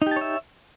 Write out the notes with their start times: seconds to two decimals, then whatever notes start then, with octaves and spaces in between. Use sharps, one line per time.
0.02 D#4
0.07 G4
0.11 A5
0.16 C#5
0.21 E5